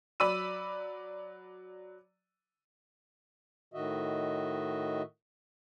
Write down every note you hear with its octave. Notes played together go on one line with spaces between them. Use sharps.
F#3 D5 B5 E6 D#7
A2 D#3 F#4 D#5 E5